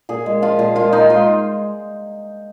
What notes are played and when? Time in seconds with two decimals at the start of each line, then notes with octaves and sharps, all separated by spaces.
0.09 A#2 G#4
0.26 G#3
0.42 F3 F4
0.59 A#2
0.76 G#3 F4
0.93 A#2 D#4
1.10 G#3 F4